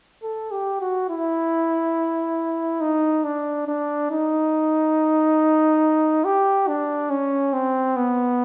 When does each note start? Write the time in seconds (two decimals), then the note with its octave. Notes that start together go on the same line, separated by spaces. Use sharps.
0.23 A4
0.51 G4
0.81 F#4
1.09 E4
2.81 D#4
3.24 D4
3.67 D4
4.10 D#4
6.25 G4
6.68 D4
7.10 C#4
7.53 C4
7.96 B3